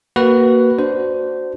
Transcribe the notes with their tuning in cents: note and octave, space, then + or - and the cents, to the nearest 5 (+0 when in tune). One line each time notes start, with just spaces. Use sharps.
A#3 +0 F#4 +20 B4 +0
D4 +0 F#4 +0 C5 -15